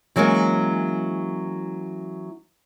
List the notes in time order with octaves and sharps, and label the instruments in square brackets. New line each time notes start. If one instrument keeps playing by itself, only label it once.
[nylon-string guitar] E3 F#3 G#3 A#3 C#4